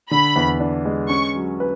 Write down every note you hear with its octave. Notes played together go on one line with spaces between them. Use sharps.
D3 B5
E2
D4
G#3
C#4 C#6
F#3
B4